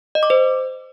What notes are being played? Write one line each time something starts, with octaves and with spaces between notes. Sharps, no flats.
D#5
D6
C5